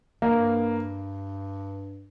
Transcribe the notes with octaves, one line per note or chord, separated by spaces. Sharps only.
G2 A#3